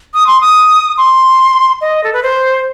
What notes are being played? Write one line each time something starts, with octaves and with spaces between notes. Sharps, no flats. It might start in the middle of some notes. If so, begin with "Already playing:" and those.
D#6
C6
D#6
C6
D#5
A4
B4
C5